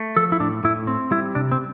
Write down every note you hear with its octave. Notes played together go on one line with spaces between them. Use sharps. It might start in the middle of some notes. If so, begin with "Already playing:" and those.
Already playing: A3
F3 A4
E4
A2 D4
A2 E4
C4
G3 E4
C3 D4
C4